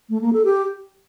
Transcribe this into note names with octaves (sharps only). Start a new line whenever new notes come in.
A3
A#3
A4
G4